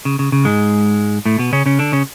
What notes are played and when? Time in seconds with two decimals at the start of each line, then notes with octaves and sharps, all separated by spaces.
0.05 C#3
0.19 C#3
0.32 C#3
0.45 G#2 G#3
1.26 A2 A3
1.39 B2 B3
1.53 C#3 C#4
1.66 C#3 C#4
1.79 D3 D4
1.92 C#3 C#4